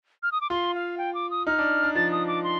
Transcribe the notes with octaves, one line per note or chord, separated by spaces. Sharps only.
F6
D#6
D6
F4 C6
F5
G5
D6
D#6
D#4 F6
D4
D4
F3 A6
D#6
D6
C6